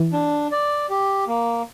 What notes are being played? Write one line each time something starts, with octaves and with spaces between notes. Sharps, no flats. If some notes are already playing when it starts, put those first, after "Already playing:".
Already playing: E3
D4
D5
G4
A#3